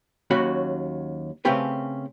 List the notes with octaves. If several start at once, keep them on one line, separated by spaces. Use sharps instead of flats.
D#2 F#3 C#4 F#4 B5
C#3 A3 C4 C#4 G4 B4